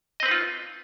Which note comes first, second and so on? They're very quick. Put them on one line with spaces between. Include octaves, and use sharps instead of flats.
D#5 C4 B4 D#4 F4